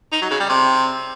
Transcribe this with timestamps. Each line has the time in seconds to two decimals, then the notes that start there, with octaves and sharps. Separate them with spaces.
0.12 D#4
0.21 F#3
0.31 C#3
0.40 G3
0.49 C3